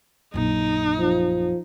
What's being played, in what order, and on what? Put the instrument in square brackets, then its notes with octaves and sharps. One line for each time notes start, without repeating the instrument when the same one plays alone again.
[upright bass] A#1 F#2 [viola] D#4
[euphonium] F3